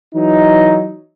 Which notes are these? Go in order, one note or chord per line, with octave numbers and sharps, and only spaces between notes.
E3 F#3 D#4